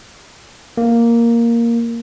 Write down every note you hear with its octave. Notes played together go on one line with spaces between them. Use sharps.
A#3